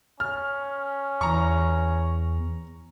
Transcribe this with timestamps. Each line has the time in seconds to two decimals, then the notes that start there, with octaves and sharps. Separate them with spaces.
0.20 C#4 F6
1.21 E2 A#5 C#6